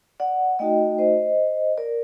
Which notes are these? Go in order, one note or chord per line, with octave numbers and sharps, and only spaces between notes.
D5 F#5
A3 D#4 F#4 D#5 G5
C5 D#5
A#4 D5